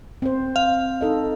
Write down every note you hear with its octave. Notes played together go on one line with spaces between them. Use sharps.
C4 C5
F5
D#4 A4 D#5